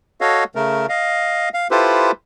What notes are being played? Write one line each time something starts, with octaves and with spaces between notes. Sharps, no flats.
F#4 A4 C#5 D#5 F5
C#3 A3 A#4
D#5 F5
F5
E4 F4 G4 A4 B4 C5